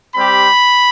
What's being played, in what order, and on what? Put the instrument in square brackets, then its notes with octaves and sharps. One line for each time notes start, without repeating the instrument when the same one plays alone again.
[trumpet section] G3 C4 G4 B5